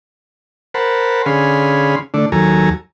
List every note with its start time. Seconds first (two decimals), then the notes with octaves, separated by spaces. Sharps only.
0.74 A#4 C5 F#5 A5 B5
1.26 D3 C#4 G#4 F5 B5 C6
2.14 D3 A3 D4
2.32 D#2 F#3 A4 G#5 A#5